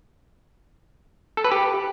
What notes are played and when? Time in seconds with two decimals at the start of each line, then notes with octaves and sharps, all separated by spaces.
1.37 A4
1.44 B4
1.52 G4